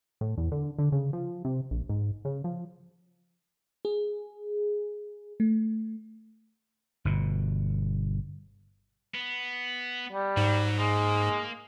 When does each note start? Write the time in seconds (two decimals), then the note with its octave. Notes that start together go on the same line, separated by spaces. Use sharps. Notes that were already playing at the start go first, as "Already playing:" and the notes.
0.21 A2
0.38 E2
0.52 D3
0.78 D3
0.92 C#3
1.13 F3
1.45 C3
1.71 A#1
1.89 G#2
2.25 C#3
2.44 F3
3.85 G#4
5.40 A3
7.05 G1 B2
9.14 B3
10.12 G3
10.37 G#2 F#3
10.79 G#3 A#3